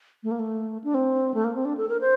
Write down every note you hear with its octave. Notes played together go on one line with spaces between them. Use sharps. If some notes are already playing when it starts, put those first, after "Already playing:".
A3
A#3
A3
D4
C4
A3
A#3
C4
D4
A4
A#4
C5